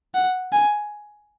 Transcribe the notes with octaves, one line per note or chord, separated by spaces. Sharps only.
F#5
G#5